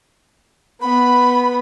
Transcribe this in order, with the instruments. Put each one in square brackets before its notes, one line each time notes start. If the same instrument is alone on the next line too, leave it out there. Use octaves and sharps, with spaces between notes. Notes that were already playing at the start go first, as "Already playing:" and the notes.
[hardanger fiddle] B3 [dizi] B5